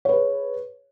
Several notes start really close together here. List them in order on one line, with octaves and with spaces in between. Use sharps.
C#5 B4 G#4